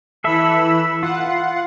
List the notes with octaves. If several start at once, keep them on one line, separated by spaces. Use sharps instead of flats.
E3 A4 E5 B5 E6
F4 F#5